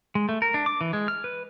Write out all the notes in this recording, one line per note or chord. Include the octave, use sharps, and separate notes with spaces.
G#3
A3
A#4
D4
D6
E3
G#3
F6
B4